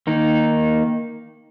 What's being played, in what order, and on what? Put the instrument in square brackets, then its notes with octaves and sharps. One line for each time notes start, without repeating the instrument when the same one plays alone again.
[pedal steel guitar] D#3 A#3 D#4